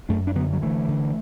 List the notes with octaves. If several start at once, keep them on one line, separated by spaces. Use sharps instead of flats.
F#2 A3 D4
D4
D3 F#3 B3
F#3
D3 E3 A3
D3